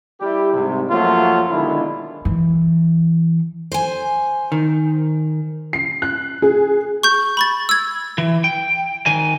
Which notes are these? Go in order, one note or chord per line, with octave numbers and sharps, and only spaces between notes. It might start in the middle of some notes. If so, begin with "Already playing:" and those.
G3 E4 G4
C2 G#2 C3
F#2 F3 F#3 A3 A#3 F4
B2 D3 D#3 G#3 D4 E4
E3
C5 G#5
D#3
C7
F#6
G#4
C#6 G6
B5 C#6 A6
E6 G#6
E3
G5
D#3 G#5